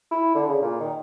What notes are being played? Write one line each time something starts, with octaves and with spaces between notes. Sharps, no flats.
E4
D3
C#3
A#2
D#3